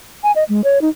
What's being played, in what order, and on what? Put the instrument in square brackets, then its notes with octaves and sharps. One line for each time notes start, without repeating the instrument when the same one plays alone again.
[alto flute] G#5
D#5
G#3
C#5
D#4